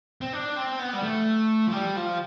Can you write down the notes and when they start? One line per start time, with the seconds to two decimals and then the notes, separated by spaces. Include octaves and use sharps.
0.21 C4
0.33 D4
0.56 C4
0.79 B3
0.93 G3
1.03 A3
1.67 F3
1.72 G3
1.96 F3